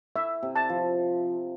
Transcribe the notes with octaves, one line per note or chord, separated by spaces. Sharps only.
E4 E5
C3
A5
F3